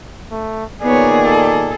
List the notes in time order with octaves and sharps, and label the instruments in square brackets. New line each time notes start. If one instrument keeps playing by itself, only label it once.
[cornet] A3
[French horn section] A#2 D#3 A#3 [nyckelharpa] B3 C#5 [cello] G#4 [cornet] D5
[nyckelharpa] A4